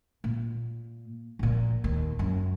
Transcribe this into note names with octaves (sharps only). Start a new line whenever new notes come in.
A#2
A#1 A#2
D#2
F#2